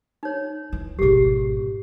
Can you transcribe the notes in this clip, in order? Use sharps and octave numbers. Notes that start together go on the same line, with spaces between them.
D#4 C#5
E3
G#1 B2 G4 G#4